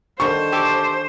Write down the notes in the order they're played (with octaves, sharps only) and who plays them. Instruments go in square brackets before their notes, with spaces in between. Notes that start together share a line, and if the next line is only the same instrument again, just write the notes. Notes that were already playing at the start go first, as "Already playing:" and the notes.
[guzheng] D3 D#3 G3 [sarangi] C5 [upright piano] C#6
[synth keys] G4 A4 D6 [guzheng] G#5